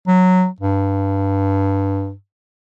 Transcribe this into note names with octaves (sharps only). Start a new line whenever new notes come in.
F#3
G2